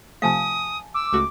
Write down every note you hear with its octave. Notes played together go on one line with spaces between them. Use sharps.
C3 F3 A3 F5 G#5 A5 D#6
D6 E6
C#2 A3 F#4